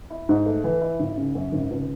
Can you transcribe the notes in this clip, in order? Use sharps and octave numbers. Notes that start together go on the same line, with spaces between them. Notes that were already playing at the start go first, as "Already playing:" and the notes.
E4
G#2
A3
E3
E4
G#1
C#3
F#2
G#1
C#2